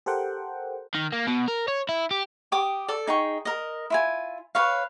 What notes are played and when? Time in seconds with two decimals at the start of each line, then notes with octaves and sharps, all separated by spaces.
0.06 G4 A4 A#4 C5 F#5 G5
0.95 D#3
1.13 A#3
1.27 B2
1.48 A#4
1.68 C#5
1.89 E4
2.11 G4
2.52 G4 G5 D6 D#6
2.88 A4 D5
3.07 D#4 G#4 G5 C#6
3.45 A#4 D#5
3.90 E4 F4 G#5
4.55 B4 C#5 F5